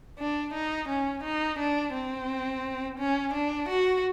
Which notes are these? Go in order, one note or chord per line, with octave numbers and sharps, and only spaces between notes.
D4
D#4
C#4
D#4
D4
C4
C#4
D4
F#4